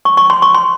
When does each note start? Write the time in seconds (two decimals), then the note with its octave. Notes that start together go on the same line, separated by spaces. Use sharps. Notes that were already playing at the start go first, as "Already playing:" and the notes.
0.05 C#6
0.17 C#6
0.30 C6
0.42 C#6
0.55 C6